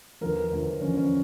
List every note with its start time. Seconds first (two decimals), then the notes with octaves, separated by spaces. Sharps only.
0.21 E2 D3 F3 A#4
0.52 E2 D3 F3
0.81 E2 D3 F3 C#4
0.97 C#4